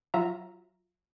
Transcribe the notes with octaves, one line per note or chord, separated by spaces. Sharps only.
F#3 F4 F#4 E5 A#5